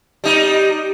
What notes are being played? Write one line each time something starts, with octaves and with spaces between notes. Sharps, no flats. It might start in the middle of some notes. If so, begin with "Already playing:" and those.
G3 D#4